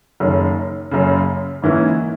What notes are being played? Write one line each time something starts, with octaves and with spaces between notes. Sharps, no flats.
F#1 F#2 D#3
F#1 F#2 C#3
G#2 E3 A#3 C#4 E4